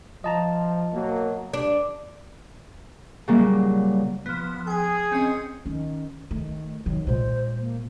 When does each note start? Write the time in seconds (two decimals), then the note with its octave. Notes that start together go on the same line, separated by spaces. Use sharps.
0.24 F3 D#5 A5 A#5
0.93 B2 F#3 A#3
1.53 G2 D4
3.28 A#2 C#3 F#3 G3 A#3
4.26 F3 B3
4.67 G#4 G5 G#5
5.12 C4 C#4 D#5
5.66 D#3 C#4
6.31 D#3 A3
6.86 D#3 F#3
7.07 A#2 G#3 C5
7.60 A#3